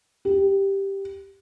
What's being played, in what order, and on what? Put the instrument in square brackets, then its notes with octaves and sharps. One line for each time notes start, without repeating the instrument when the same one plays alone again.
[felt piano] G4